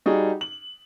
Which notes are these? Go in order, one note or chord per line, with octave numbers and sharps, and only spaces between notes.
G3 D#4 F#4 G#4
F#7